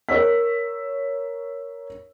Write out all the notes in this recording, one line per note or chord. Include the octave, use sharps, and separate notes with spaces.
A#4 C#5 E6 B6